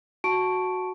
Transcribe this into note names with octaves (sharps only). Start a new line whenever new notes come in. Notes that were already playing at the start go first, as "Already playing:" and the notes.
F#4 A5 C#6 D7